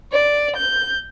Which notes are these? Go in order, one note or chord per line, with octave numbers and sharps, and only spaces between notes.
D5
G6